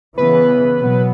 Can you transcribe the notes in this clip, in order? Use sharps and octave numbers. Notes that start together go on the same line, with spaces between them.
C#3 E3 B3 B4
B2 F#3 B3